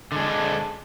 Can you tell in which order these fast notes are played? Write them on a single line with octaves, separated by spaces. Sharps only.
D3 G#3 D4